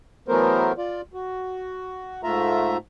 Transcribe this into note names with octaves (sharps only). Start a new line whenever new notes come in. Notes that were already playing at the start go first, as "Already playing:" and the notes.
E3 F#3 A3 B3 A#4 C5
F4 D5
F#4
G#2 A3 F4 E5 A#5